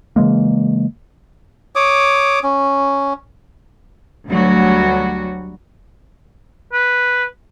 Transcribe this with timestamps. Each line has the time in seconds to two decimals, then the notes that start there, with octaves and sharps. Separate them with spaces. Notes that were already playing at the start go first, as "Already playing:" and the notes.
0.16 C#3 E3 G#3 A#3
1.75 C#5 D6 D#6
2.43 C#4
4.27 D2 F#3 G3 F#4
6.73 B4